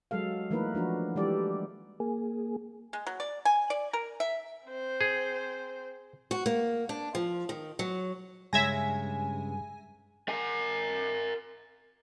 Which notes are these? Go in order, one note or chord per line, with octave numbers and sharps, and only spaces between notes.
F#3 G#3 A4 F5
E3 A3 A#3 D#4 A#4 B4
F3 D4 F#4
E3 G3 G#3 G4 A4 D5
A#3 G#4
G#3
F#3
D5
G#5
D5
A#4
E5
C4 C5
G#4
F#4
A#3
D4
F3
D#3
F#3
G2 C#3 G#3 E5 G#5 G#6 A#6
A#4 G#5